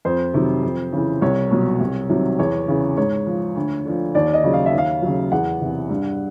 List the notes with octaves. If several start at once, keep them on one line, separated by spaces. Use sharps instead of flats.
F2 C5
C3 D#3 F#3
F2
C#3 E3
C2 C#5
B2 F#3
C2
C3 D#3 F#3
E2 C#5
C#3 E3
G#2 C#5
F3
D2
D3 F3
D#2 D5
D#5
C#3 F#3
F5
E5
D#2
F5
C#3 F#3
E2 F#5
C3 E3
G2